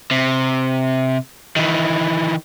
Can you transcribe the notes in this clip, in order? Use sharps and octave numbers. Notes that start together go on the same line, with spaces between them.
C3
D#3 E3